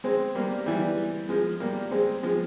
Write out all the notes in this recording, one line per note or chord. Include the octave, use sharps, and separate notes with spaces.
G#3 C4
G3 A#3
E3 G3
F3 G#3
G3 A#3
G#3 C4
F3 G#3